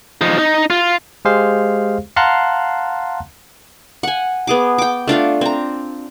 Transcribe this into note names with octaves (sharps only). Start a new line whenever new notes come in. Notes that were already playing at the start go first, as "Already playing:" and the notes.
F3 D#4
D#4
F4
G#3 G4 G#4 C5 F5
F5 F#5 A5 A#5 C6 F#6
F#5 G#5
B3 G#4 D6
G5 D6
A3 D4 F4 F5
C4 A#5